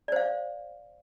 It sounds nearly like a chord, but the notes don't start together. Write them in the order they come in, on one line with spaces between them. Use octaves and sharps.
D5 C5 F5